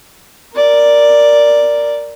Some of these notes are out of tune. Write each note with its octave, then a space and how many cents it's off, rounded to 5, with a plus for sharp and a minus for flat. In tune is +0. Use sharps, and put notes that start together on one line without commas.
A#4 +0 D5 +0